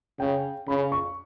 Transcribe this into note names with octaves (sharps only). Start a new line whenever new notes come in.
C#3 G5
C#3 B5
C#6